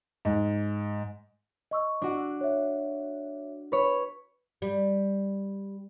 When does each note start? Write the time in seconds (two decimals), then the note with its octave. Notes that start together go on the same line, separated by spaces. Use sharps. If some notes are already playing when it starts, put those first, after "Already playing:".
0.25 G#2
1.71 D#5 C#6 E6
2.02 D4 F#4
2.41 C#5 E5
3.72 B4 C#5
4.62 G3